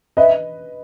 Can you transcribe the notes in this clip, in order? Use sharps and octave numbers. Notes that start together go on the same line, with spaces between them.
B4 D#5 E5